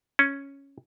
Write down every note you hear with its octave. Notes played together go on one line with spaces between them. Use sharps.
C#4